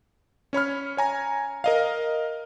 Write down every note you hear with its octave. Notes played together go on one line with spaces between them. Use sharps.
C#4 C#5 B5 F6
C#5 G#5 A#5
A#4 D#5 F5